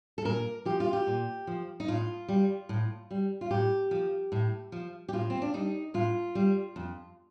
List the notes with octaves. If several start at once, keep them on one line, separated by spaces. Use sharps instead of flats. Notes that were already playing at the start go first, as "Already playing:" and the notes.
A4
A#2 A#4
F3 G4
F4
G4
A#2
F3
D#4
A2 F4
G3
A2
G3
F4
A2 G4
F3
A2
F3
G4
A2 F4
C4
D4
G3 D#4
A2 F4
G3
F2